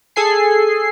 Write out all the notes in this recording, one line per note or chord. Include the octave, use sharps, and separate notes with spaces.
G#4 A4 G#5 C7